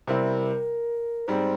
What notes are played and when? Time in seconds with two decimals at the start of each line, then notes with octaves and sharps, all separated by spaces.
0.07 C3 G3 C4 E4 A#4
1.27 G#2 G3 C4 C5